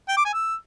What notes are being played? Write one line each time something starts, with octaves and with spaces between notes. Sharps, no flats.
G5
D6
G#5
E6